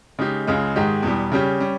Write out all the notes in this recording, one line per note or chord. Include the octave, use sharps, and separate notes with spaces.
C#3 G#3 D#4 G4
C#2 C#3 G#3
G#2 D#3 G#3 D#4 G4
E2 B2 G3
C#3 G3 C#4 G4
G3 C#4